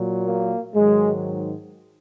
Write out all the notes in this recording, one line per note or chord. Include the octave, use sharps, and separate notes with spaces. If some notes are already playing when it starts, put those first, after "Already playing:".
Already playing: A#2 F#3
A#3
G#2 D#3 F#3 G#3